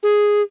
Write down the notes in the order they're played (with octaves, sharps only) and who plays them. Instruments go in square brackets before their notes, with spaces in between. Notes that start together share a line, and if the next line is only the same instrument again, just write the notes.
[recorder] G#4